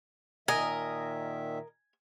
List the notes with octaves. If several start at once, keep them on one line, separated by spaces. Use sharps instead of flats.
A#2 D#3 A#4 D#5 E5 G#5